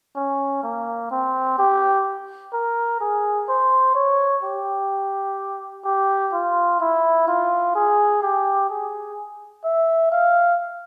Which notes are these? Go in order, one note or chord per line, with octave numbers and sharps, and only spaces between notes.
C#4
A#3
C4
G4
A#4
G#4
C5
C#5
G4
G4
F4
E4
F4
G#4
G4
G#4
E5
F5